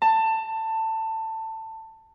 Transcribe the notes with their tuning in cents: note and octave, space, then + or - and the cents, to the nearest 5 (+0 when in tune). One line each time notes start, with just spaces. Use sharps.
A5 +20